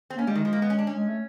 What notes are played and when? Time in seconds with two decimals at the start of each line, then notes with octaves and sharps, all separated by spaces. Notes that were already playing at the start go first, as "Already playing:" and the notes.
0.10 C4
0.16 A#3 C#4
0.27 G3 G#3
0.35 D#3
0.45 F3
0.53 A#3
0.62 B3
0.70 C#4
0.79 D4
0.87 C#4
0.95 G#3
1.08 A3